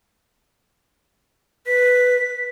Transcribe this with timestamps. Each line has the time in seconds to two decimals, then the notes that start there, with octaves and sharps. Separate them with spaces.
1.67 B4 B6